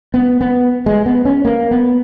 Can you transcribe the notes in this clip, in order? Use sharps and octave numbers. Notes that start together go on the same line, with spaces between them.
B3
B3
G#3
B3
C#4
A#3
B3